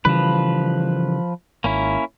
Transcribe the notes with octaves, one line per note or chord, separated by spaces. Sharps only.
C#3 E3 F3 G3 B4
G#1 A#3 C#4 E4